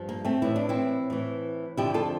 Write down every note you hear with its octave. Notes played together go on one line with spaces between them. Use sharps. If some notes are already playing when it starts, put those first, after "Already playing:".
Already playing: G2 F3
A#3
A3 C4
A2 E3 E4
D4
C4 E4
A2 E3
F2 D3 F3 E4 G4
F4 A4